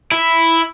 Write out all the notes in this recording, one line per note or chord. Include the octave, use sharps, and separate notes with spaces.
E4